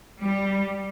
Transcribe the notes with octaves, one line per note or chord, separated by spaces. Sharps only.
G3